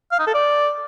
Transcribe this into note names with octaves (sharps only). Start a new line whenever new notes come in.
F5
D#4
A4
D5